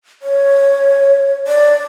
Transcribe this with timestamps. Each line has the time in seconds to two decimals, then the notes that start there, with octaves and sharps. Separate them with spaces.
0.22 C#5
1.47 D5